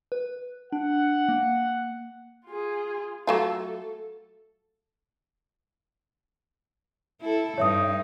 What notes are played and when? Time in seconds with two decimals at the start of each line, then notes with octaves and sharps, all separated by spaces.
0.12 B4
0.73 D4 F#5
1.29 A#3
2.46 F4 G#4
3.27 F#3 A3 F4 A4
7.21 E4 A4
7.58 G2 D#4 C#5 E5 D#6